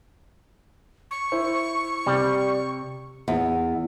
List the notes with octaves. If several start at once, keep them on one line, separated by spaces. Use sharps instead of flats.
C#6
E4 C5
C3 G3
E2